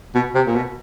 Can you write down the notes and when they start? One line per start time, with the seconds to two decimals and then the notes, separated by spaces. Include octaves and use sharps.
0.15 B2
0.35 C3
0.46 A#2
0.55 B2